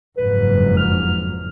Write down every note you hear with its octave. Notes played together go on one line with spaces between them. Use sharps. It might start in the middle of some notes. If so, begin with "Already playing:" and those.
F#1 F2 G#2 B4
F6